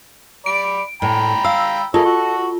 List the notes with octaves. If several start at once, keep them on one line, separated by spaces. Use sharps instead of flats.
D5 B5 D7
A2 G5 A#5 B5
F5 E6
A#3 F4 G#4 A4 C#5
F#4 C#6